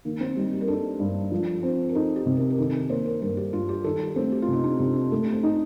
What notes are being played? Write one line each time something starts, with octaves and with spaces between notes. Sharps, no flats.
D#3 A#3
C4
G3 D#4
G4
A#4
D4 A4
G2
F3
C4
A#4
D#4 A4
G4
C3
A#4
A#4
D#3 A4
A#4
A#3 C5
A#4
G2 A#4
G4
G2 F4
G4
D#3 A4
A3 C4
G4
F4
C3 D#4
D4
C3 G4
D#4
C4
A3 D4
C4
D#4